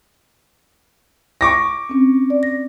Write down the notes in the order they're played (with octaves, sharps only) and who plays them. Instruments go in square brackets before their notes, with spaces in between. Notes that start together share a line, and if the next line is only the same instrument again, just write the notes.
[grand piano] C#6 D6 A#6
[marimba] C4 C#4
D5
A#6